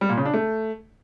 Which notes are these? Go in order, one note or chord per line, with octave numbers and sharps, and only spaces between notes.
G3
A#2
C#3
D4
A3